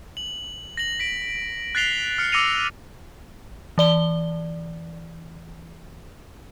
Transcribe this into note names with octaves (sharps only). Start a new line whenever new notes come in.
F#7
A#6 F#7
B6 D7
F#6 A6 B6 C7 F7 G7
F6 C#7
D6 E6 A#6 C#7 D#7 F7
E3 D5 G7